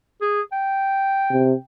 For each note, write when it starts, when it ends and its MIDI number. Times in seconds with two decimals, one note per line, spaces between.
0.22 0.41 68
0.52 1.64 79
1.32 1.53 48